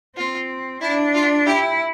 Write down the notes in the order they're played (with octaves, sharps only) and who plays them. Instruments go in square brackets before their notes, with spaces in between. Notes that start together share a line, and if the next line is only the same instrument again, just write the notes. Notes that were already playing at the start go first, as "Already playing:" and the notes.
[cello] C4 [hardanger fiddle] F4
[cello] D4 [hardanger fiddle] E4
[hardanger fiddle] F4
[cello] E4 [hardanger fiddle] G4